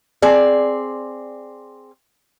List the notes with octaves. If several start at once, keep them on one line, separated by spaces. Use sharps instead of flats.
C4 G#4 D5